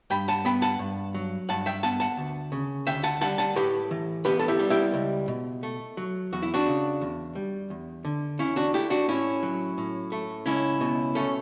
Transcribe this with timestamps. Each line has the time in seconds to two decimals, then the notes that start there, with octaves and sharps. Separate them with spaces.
0.10 G2 G5 B5
0.28 F#5 A5
0.45 B3 G5 B5
0.62 F#5 A5
0.79 G2
1.14 F#3
1.49 G2 F#5 A5
1.66 E5 G5
1.83 B3 F#5 A5
2.00 F#5 A5
2.17 D2
2.52 C#3
2.87 D2 E5 G5
3.03 F#5 A5
3.21 G3 F#5 A5
3.38 F#5 A5
3.56 A2 G4 B4
3.91 E3
4.25 B3 G4 B4
4.39 A4
4.48 E4 G4
4.59 G3
4.70 E4 G4
4.93 C#2
5.28 B2
5.63 A3
5.97 F#3
6.33 E2 F#4
6.42 E4
6.54 D4 F#4
6.67 C#3
7.01 E2
7.35 G3
7.70 E2
8.05 D3
8.39 E2 C#4 E4
8.56 D4 F#4
8.74 A3 E4 G4
8.90 D4 F#4
9.08 A2 C#4 E4
9.43 F#3
9.78 A2
10.12 A3
10.46 C#2 C#4 E4
10.81 B2
11.15 A3 C#4